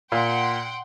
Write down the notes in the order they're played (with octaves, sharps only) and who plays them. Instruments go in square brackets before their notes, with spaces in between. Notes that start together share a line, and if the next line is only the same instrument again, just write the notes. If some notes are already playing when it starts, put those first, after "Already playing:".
[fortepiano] A#2 [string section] F#5 G5 C6